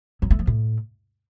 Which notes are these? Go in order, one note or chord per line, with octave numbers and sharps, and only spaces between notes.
F#3
A3
F3
A2